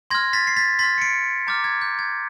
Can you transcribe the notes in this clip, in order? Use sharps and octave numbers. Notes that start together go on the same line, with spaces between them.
C6 F6 G#6 A#6
A6 B6
C7
A6 B6
C6 F6 A6 B6
C#7
C7 D7
A#5 D6 F6 G6 A6
G#6
G6
G#6